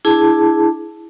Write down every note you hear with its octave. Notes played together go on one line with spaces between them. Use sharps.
D4 E4 G#4 A5